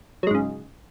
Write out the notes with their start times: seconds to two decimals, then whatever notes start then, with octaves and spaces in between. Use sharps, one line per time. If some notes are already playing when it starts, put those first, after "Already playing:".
0.23 F#3
0.27 G#3
0.31 G#2
0.35 C#3